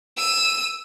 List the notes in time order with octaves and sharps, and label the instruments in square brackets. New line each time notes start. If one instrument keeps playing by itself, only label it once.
[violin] E6 D#7